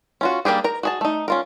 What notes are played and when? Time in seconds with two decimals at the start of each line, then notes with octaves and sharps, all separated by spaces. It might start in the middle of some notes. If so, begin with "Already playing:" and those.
0.21 C#4 F4 F#4
0.45 G3 A#3 D4 G4 G#4
0.64 A#4 A#5
0.83 F#4 G#4 A5
1.01 A3 D#4
1.28 C#4 F4 A#4